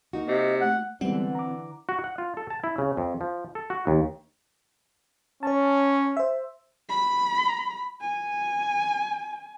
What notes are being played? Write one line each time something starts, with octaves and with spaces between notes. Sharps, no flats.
A#3 D#4 F#4
C3 D#5
A3 F#5
D3 E3 G3 G#3 B3 C4 F#5
A#5 D6
F#4
F#5
F4
A4
A5
E4
C#3
F2
F3
A4
F#4
D#2
C#4 C#5 A5
C5 E5
B5
G#5